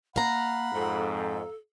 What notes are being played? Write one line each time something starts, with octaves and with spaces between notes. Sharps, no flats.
A#3 F5 F#5 A#5 B5
F2 G#2 A4